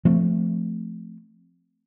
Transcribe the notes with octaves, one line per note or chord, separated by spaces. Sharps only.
F3 A3 C4